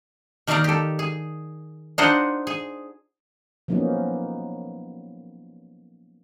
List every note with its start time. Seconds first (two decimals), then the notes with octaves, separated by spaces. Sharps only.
0.47 D#3 A#3 D#4 D5 F5 A#5
0.64 G4 A4
0.99 G#4
1.98 D4 D#4 F4 G#4 C5 F#5
2.47 G#4
3.68 F3 F#3 A#3 B3 C#4 D#4